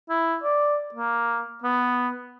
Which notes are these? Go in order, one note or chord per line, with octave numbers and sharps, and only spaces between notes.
E4
D5
A#3
B3